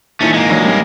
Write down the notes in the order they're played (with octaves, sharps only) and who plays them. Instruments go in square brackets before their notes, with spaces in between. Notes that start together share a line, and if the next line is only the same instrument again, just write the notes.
[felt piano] A#2 E3 D#4 [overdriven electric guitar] A3 C#4
[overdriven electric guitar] G#3 A#3
[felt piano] A#1 D#3 F#3
D#3 G3 C#4